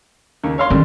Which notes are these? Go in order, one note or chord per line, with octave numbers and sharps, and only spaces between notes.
D#2 C#3
C#5 F5 C6
D3 D#3 G3 C#4 D4